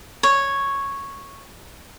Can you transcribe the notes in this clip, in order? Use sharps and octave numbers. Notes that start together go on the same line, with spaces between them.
C#5